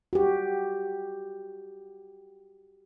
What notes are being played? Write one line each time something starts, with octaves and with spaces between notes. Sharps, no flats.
F#4 G4